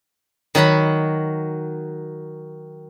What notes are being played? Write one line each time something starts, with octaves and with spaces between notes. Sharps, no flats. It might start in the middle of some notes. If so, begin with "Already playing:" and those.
D#3 F#3 F#4 B5